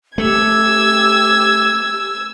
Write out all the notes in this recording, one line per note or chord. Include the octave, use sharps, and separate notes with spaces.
A3 G4 E6 G#6